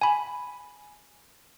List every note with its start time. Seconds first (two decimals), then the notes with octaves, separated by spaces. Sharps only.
0.01 G#5 B5